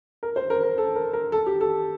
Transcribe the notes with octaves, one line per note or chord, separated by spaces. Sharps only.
A#4
C5
A#4
A#4
A4
A#4
A#4
A4
G4
A4